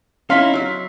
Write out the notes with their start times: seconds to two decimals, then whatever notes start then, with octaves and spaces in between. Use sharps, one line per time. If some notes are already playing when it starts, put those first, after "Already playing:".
0.30 C#4 D#4 E4 F5 C6 B6
0.53 F#3 E5